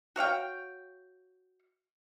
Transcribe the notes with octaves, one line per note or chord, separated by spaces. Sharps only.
F#4 C#5 F5 G5